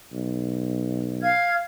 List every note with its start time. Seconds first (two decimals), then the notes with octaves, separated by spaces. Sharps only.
0.13 B1
1.22 F5 F6 G#6